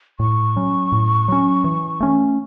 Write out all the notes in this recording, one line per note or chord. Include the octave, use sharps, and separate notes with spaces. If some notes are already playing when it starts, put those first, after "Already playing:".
A2 C#6
F#3 C#4
A2
F#3 C#4
E3
A3 C#4